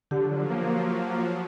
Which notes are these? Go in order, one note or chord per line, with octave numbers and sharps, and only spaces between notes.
D3 F3 F#3 G4
A#3